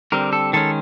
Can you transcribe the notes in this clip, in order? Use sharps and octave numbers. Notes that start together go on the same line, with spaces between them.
D3 G3 C4 A#4
A4
D#3 G#3 C#4 A4